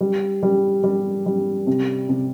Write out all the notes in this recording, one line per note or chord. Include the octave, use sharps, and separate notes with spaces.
G3
G3
G3
G3
C3
C3